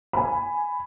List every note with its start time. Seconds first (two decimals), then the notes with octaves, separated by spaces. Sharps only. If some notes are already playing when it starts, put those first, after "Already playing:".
0.13 G#5 B5